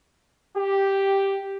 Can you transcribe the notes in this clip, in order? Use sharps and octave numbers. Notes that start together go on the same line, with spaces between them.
G4